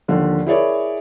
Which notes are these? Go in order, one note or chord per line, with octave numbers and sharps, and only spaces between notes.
D#2 D3 F3
E4 G#4 A#4 C#5 D5